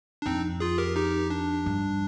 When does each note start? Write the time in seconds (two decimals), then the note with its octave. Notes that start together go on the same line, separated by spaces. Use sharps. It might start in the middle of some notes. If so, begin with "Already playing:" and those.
0.22 D4
0.26 F2 C4 D#4
0.60 F4 G#4
0.78 G4 A#4
0.96 D#4 G4
1.30 D4
1.66 G2